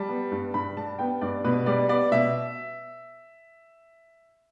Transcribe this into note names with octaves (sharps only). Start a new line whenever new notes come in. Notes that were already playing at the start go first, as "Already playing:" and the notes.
Already playing: G3 A5
B3
G2
G2 B5
G3 A5
B3 G5
G2 D5
B2 B4
G3 D5
B3 D5
B2 E5